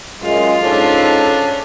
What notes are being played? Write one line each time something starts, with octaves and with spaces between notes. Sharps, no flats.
F#2 G#3 F4
G#2 C#4 D4 A4